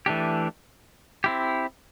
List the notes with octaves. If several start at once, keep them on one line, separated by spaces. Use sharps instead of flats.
E3 A3 D4 G4
C4 E4 G4